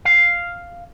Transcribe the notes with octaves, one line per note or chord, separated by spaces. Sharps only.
F5